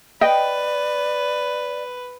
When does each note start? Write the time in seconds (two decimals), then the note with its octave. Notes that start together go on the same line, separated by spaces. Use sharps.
0.21 B4 D5 D#5 G5